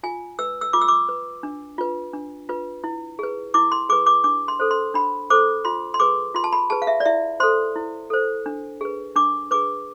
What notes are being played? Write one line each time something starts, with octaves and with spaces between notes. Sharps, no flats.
F4 G#5
B4 E6
E6
F4 D6
E6
D6
B4
D4
F4 B4
D4
F4 B4
E4
G#4 B4
E4 D6
C6
G#4 B4 D6
D6
D4 D6
C6
A4 C5
C6
D4 B5
A4 C5 D6
F4 C6
C6
G#4 B4 D6
F4 C6
A5
B5
G#4 B4 A5
F5
E5
D5
E4 E5
A4 C5 C6
E4
A4 C5
D4
G#4 B4
D4 D6
G#4 B4 D6